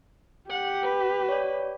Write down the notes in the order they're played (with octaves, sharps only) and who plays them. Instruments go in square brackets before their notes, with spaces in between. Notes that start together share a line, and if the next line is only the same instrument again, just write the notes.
[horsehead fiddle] G4 [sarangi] F#5
[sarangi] B4
[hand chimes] C#5 D5